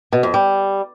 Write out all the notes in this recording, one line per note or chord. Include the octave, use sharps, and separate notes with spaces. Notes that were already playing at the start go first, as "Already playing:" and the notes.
B2
F2
G3